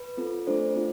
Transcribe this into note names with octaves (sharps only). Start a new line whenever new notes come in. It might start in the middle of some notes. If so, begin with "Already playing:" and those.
Already playing: B4
C4 F4 A4
A3 D4 A4 C5
C4 F4